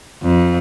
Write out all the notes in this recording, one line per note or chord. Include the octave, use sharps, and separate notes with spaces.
F2